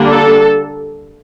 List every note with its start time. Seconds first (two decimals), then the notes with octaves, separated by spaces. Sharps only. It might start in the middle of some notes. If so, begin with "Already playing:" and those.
Already playing: D3 G3 A#3 D4
0.10 A4